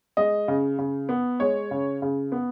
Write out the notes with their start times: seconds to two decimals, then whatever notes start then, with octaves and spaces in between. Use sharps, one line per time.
0.17 G#3 D#5
0.48 C#3
0.78 C#3
1.09 B3
1.40 G#3 C#5
1.71 C#3
2.02 C#3
2.32 B3